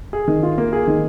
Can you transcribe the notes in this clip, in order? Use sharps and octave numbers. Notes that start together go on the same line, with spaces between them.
G#4
D#3
F4
A#3
G#4
D#3